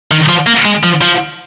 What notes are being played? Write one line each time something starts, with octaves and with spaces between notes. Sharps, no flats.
D#3
F3
A#3
G#3
F3
F3